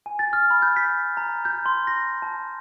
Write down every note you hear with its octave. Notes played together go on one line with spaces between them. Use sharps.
G#5
A6
F6
B5
G6
B6
A#5
G6
C6
A#6
A5